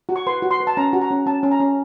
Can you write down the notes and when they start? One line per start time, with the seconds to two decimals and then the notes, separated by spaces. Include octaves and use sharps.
0.09 F#4
0.16 C#6
0.27 B4 C6
0.42 F#4
0.51 C6
0.60 B4
0.67 A5
0.77 C#4 A#5
0.93 F#4
1.02 A#5
1.11 C#4
1.26 C#4 A5
1.43 C#4
1.51 A#5
1.60 C#4